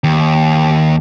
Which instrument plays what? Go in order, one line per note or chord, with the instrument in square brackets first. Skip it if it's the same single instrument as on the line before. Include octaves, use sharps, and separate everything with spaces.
[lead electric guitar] D#2